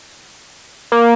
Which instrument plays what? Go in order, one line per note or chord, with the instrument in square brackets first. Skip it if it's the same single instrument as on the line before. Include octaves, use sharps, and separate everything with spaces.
[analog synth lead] A#3